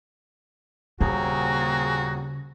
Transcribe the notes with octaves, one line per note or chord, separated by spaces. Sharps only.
D#1 C#3 A#3 C4 F#4 G#4